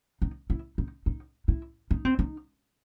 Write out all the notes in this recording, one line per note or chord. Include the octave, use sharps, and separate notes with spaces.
D#4
E4
D#4
D#4
E4
D#4
C4
D#4